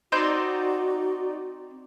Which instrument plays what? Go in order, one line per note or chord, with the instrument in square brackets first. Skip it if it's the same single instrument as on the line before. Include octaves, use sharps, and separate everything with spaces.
[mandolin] C4 C6 G6 [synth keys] D#4 D5 [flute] F#4